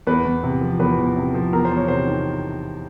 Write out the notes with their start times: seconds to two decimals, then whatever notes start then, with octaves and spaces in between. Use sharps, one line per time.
0.07 E2 B4
0.25 E2
0.43 C3
0.61 F3
0.80 E2 B4
0.98 E2
1.16 C3
1.34 F3
1.53 E2 A#4
1.65 C5
1.71 E2
1.77 C#5
1.88 C3 C5
2.07 D#3